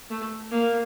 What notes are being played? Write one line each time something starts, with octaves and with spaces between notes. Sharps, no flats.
A3
A#3